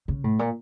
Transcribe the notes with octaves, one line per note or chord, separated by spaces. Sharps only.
C#3
A2
A#2